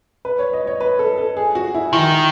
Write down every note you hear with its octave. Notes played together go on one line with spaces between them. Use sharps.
B4
C#5
D#5
C#5
B4
A4
A4
G#4
F#4
E4
D#3 E4